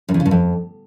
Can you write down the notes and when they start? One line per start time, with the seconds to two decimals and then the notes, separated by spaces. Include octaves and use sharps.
0.09 F#2
0.14 E2
0.20 C#3
0.26 G2
0.31 F2